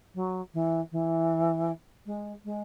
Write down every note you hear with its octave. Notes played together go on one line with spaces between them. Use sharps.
F#3
E3
E3
G#3
G#3